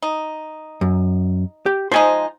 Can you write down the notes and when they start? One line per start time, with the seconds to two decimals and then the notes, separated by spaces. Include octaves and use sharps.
0.02 D#4
0.81 F#2
1.66 G4
1.92 F3 G#3 D#4 C5 G#5